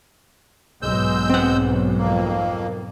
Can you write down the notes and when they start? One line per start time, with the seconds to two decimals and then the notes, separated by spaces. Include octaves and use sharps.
0.82 B1 G#2 G#3 E6 G6
1.30 C4 F#5
1.98 F2 A#3